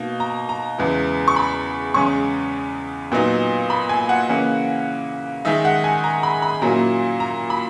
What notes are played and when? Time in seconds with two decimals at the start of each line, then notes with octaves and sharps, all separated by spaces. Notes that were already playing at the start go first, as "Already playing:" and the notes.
Already playing: B2 A#3 D#4
0.20 A#5
0.49 A#5
0.78 E2 C#3 G#3 B3 E4
1.28 C#6
1.36 B5
1.94 E2 C#3 G#3 C#4 C#6
3.12 A#2 F#3 B3 D#4
3.70 B5
3.89 G#5
4.09 F#5
4.29 C#3 E3 A#3 C#4
5.45 D#3 G#3 D#4 E5
5.65 F#5
5.84 G#5
6.04 A#5
6.23 B5
6.42 B5
6.62 A#2 F#3 A#3 C#4 E4 A#5
7.20 A#5
7.50 B5